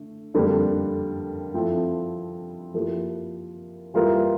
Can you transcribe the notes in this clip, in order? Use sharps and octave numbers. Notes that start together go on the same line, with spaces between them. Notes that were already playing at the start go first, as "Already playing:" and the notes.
Already playing: D3 A3
F2 D3 G3 A#3 D4
F3 C4 E4 A4
F3 A#3 E4 G4
E3 G3 A#3 F4 A#4